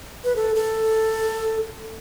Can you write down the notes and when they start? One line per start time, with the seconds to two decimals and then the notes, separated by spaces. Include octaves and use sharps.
0.24 B4
0.36 A4
0.55 A4